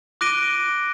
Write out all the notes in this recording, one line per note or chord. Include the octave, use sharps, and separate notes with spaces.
D6 F#6 A#6 D7 D#7 G7